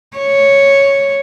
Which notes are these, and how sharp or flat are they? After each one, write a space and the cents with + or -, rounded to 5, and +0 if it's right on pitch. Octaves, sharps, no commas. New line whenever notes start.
C#5 +0